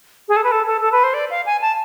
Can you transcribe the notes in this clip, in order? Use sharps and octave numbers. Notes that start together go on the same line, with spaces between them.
G#4
A4
B4
A4
A4
A4
B4
C5
D5
F5
G#5
A5